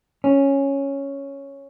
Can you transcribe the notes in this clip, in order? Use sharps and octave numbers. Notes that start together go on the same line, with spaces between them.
C#4